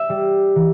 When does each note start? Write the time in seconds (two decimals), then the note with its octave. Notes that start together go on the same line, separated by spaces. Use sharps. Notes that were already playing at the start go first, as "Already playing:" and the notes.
Already playing: E5
0.09 G3
0.56 E3